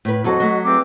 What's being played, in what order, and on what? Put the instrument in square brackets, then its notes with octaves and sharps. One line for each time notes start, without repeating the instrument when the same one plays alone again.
[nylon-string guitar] A2 B4
[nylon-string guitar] F2 F#3 A4 [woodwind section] F#4 D#5
[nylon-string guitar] F#3 A3
[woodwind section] E2 C4 D6